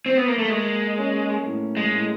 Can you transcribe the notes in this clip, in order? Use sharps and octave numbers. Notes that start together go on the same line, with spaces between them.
C4
B3
A#3
A3
G#3 A#3
C#4
A2
G#3
A2